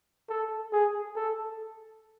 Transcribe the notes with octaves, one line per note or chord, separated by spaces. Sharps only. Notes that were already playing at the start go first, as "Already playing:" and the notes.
A4
G#4
A4